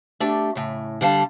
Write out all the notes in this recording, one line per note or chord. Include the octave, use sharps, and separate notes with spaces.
A3 D4 G4
A2 C#3
D3 G3 F5 A5